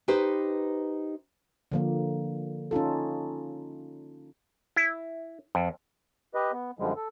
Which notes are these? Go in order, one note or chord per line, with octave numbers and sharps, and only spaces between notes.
D#4 G4 B4 C5
D3 F3 A#3
C#4 D#4 F4 A4
E4
F2
G4 B4 D#5
B3
F#2 D3 F3 G3 G#3
A4